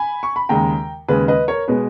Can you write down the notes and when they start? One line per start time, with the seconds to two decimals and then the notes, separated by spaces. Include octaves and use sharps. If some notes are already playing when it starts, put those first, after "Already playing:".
Already playing: G#5 B5
0.23 C#6
0.36 B5
0.49 D#2 C#3 G#3 G5 A#5
1.08 D#2 C#3 G#3 B4
1.28 B4 D#5
1.48 A#4 C#5
1.68 B2 G#3 B4